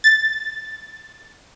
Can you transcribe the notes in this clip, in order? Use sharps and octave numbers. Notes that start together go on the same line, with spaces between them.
A6